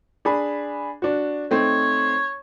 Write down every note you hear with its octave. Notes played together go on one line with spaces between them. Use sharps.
D4 G#4 B5
D4 F#4
A3 C4 D#4 C#5